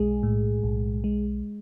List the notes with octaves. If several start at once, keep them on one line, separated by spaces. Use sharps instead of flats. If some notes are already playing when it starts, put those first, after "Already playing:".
Already playing: B1 G#3 G#4
A2
B1
G#3